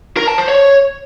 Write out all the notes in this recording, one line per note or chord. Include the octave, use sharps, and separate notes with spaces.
A#4
A5
C5
C#5